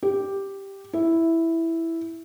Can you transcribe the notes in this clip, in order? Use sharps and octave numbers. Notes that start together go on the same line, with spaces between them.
G4
E4